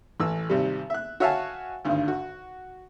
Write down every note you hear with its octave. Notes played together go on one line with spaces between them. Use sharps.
A1 E3 E6
G#1 C3 G3
E5 F#6
F#4 C#5 E5 F5 G#5 A5
G#1 D2 G2
F#4